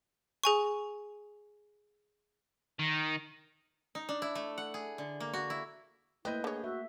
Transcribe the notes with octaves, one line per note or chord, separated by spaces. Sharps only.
G#4 G#5 C#6
D#3
D#4
D4
E4
A3
F#5
G#4
D3
A#3
F#4
E4
A3 A#3 C4 E4 B4 D#5 G6
D3 G#4 C#5
F#4 E5